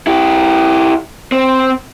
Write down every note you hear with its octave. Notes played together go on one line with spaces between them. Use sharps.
E4 G4
C4